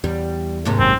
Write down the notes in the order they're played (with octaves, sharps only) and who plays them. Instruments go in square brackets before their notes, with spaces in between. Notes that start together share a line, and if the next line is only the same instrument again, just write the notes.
[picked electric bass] E2 [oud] G3
[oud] D#2 G#2 C3
[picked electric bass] G#1 F#2 [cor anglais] C4